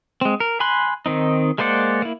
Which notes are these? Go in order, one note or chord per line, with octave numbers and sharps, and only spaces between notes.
G#3 C4
A#4
G#5 B5 C6 F#6
D#3 C4 D#4
G#3 A#3 C5 D5 F#5
A#3 E4